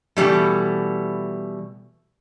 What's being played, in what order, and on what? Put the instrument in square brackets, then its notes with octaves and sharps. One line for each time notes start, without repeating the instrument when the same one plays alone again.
[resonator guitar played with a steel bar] B2 E3 F#3 G3 A3